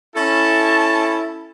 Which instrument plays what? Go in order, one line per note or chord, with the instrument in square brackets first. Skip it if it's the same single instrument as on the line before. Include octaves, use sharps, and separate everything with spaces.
[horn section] C#4 A4 [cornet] E4 [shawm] A5